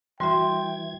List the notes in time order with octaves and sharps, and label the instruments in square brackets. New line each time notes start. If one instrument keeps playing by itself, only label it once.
[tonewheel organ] E3 G#6 [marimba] G3 F#4 E5 [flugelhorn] G5 [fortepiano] C6